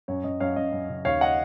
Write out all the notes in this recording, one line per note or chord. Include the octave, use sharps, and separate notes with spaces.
F#2 C#5
F#2 D#5
F#2 C#5 F5
F#2 D#5
F#2
C#3
D#2 C#5 F5
D#5 F#5